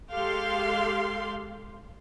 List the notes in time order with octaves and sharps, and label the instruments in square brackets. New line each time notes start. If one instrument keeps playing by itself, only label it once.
[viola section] G#3 G4 A4 F5 C6